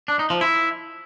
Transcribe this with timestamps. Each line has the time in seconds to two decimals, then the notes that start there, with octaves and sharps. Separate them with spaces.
0.08 D4
0.19 D#4
0.30 F3
0.41 E4